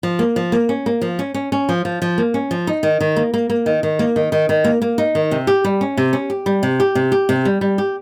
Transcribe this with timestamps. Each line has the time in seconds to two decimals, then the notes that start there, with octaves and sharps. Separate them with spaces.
0.03 F3
0.19 A#3
0.36 F3
0.52 A#3
0.69 C#4
0.86 A#3
1.01 F3
1.19 C#4
1.34 C#4
1.52 C#4
1.69 F3
1.85 F3
2.02 F3
2.18 A#3
2.34 C#4
2.51 F3
2.67 D#4
2.83 D#3
3.00 D#3
3.16 A#3
3.34 A#3
3.50 A#3
3.66 D#3
3.83 D#3
3.99 A#3
4.16 D#3
4.32 D#3
4.49 D#3
4.64 A#3
4.82 A#3
4.98 D#4
5.15 D#3
5.31 C3
5.47 G4
5.64 G3
5.81 C#4
5.97 C3
6.13 C#4
6.30 G4
6.46 G3
6.63 C3
6.80 G4
6.95 C3
7.12 G4
7.29 C3
7.45 G3
7.61 G3
7.78 G4